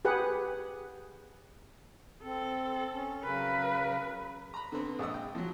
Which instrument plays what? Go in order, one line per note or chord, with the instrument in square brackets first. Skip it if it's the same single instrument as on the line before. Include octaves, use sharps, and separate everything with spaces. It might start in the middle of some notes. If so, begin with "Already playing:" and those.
[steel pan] G4 G#4 B4 F#5
[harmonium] C4 [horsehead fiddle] A4
[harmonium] C#4
[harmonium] C#3 A#4 [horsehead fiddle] F#3 B4
[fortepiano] A#5 B5
D3 B3 C4
A#1 G#3 F#5 D#6 E6
G5
F3 F#3